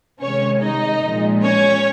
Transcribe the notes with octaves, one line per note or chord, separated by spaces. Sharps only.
C3 D#3 G#3 C#4 C#5
D#4 D#5
A#2 F3 G#3
C#4 C#5